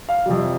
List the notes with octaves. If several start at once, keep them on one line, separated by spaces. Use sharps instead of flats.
F5
F2 C3 G3